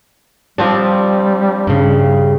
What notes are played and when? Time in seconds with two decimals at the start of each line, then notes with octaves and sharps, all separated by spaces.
0.58 F3 G3 C4 D4
1.67 G2 C#3